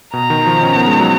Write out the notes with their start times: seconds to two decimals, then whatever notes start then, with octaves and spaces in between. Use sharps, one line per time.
0.13 B2 A#5
0.30 D#3
0.46 F3
0.63 C#4
0.75 B3
0.87 G#3
1.00 F#3